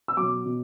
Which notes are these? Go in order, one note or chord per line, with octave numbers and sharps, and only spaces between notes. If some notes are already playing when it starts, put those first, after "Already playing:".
E6
B2 F#3 D6
B2